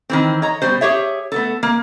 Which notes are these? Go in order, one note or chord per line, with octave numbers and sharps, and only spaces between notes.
D#3 E3 C4
C#5 D#5 A#5
B2 G3 C5
G4 G#4 C#5 E5
A3 B3 A4
A#3